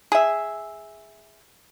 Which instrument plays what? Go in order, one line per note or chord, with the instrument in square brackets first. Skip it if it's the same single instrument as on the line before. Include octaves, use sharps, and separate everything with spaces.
[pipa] G#4 E5